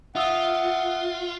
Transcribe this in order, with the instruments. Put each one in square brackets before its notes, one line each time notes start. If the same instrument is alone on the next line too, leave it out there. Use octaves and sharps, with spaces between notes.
[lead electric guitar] F4 [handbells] E5 D#6 E6 [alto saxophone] F#5